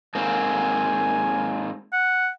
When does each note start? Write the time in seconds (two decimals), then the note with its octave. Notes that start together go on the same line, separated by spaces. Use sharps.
0.15 G#2 A#3 C4 G#5
1.93 F#5